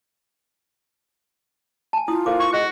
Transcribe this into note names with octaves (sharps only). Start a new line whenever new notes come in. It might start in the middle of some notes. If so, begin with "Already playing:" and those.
G#5 A5
E4 F4 D#6
A#3 A4 C5 D6
C#6
G#3 F#4